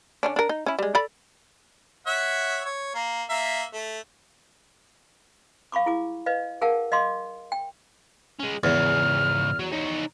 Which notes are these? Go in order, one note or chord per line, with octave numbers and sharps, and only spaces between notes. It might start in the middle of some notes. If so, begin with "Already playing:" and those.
D3 C#4 D4
D4 A#4
D#4
C#4 E4
G3 G#3
A4 D5 B5
C#5 E5 F#5
C#5
A#3
A#3 E5
A3
F5 B5 C#6 D6
E4 G#4 D6
B4 D#5 F5
G#4 A#4 F5 F#5 A5
D#5 F5 C6 D6
G5
G#3 C#4
E2 G#2 C#3 F6
F#3
D#4 C#5